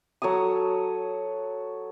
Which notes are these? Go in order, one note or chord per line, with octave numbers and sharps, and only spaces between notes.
F#3 A4 C#5 D#6